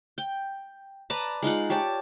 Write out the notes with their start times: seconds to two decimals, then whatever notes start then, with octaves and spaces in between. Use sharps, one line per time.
0.18 G5
1.10 B4 D5 A5 A#5
1.42 G#3 D#4 F4 F#5
1.70 G4 C#5 D5 A5